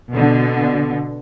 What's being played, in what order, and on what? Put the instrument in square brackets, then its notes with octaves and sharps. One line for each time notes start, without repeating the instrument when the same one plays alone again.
[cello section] B2 D3